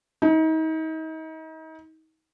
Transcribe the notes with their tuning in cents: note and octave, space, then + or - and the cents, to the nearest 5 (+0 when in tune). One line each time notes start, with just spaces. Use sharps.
D#4 +35